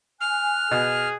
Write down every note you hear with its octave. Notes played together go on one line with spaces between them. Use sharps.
G#5 F6 F#6
B2 G#4